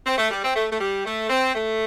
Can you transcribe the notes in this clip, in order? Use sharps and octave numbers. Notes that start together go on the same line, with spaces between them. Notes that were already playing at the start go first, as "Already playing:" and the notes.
C4
A3
G3
C4
A3
A3
G3
A3
C4
A3